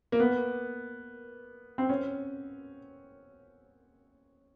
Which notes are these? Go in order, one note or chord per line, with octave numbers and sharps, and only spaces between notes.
A#3
B3
C4
C#4